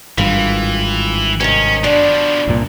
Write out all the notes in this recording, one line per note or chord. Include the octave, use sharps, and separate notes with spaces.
G#1 G2 E3 F4
C3 D#3 C#4
B2 F3 D4
C2 G2 A#2